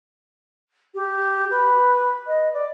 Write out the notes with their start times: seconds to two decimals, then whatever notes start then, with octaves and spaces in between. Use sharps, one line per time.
0.94 G4
1.50 B4
2.27 D#5
2.53 D5